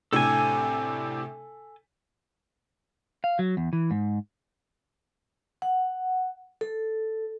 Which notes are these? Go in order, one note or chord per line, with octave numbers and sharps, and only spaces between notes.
A2 C3 D4 A4 G#5
F5
F#3
E2
E3
G#2
F#5
A4